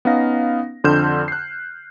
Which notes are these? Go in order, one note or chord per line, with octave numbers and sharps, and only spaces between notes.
B3 C#4 D#4 F5 A#6
F2 D3 C6 F6 G6 E7
F#6 C7